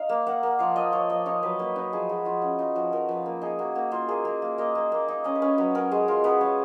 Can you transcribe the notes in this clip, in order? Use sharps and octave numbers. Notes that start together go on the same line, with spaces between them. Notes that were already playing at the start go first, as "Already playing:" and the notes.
Already playing: D#4 F5
A#3
A#3 F#5
A#3
F3 F5
F3 D#5
F3 C#5
F3 D#5
D#4 C#5
F#3 B4
A#3 B4
D#4 B4
F3 G#4
G#3 F#4
F3 F4
C#4 F#4
D#4 F4
F3 F#4
F3 A#4
F3 B4
A#3 A#4
D#4 G#4
A#3 F#4
A#3 F#4
A#3 F4
A#3 G#4
A#3 A#4
A#3
A#3 D#5
A#3
A#3
D#4
C#4 D#5
B4
C#4 C#5
F#3 B4
C#4 A#4
G#3 G#4
F4 A#4
B3 B4
G#3 C#5